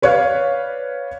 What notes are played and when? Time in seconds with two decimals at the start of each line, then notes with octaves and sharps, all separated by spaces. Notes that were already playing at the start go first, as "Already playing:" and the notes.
0.02 B4 C#5 D5 F5